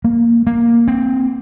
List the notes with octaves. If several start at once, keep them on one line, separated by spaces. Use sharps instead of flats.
A#3
A#3
C4